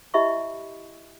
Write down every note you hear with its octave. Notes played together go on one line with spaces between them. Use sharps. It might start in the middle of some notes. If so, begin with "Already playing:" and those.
E4 G4 D#5 E5 B5 C#6